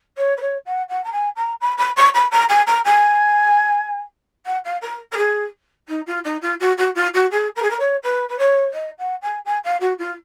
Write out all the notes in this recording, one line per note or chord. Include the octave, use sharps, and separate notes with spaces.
C#5
B4
C#5
F#5
F#5
A#5
G#5
A#5
B5
B5
C#6
B5
A#5
G#5
A#5
G#5
F#5
F5
A#4
A#4
G#4
D#4
F4
D#4
F4
F#4
F#4
F4
F#4
G#4
A#4
G#4
A#4
C#5
B4
B4
C#5
D#5
F#5
G#5
G#5
F5
F#4
F4